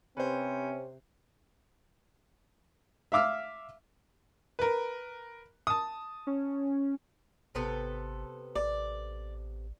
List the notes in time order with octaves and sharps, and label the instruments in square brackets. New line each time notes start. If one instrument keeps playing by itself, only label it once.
[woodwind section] C3 [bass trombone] C4 [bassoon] C#4 [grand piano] B4 C5
[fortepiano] E5 F5 D6 E6 F6
[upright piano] A#4 B4
A5 D#6
[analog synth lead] C#4
[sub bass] G#1 [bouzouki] C3 B3 A4
[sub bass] A1 [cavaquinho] D5